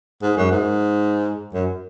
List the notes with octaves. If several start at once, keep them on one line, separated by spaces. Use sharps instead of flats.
G#2
F#2
G#2
F#2